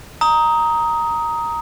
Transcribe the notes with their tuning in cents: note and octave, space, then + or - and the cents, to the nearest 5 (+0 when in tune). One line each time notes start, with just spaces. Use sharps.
A#5 +0 D#6 +15